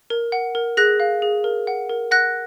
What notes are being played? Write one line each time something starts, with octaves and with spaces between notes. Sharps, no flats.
A#4
F#5
A#4
G#4 F#6 A#6
F5
G#4
A#4
F#5
A#4
F#5 F#6 A#6